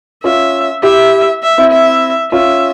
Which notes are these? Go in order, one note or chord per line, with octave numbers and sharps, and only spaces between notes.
C#4 F4 E5
E4 G4 E5
E5
C4 E4
E5
C#4 F4 E5